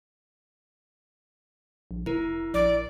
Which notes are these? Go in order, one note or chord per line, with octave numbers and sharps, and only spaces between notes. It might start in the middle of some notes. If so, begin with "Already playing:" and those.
A#1
F1 E4 A#4
A#1 D5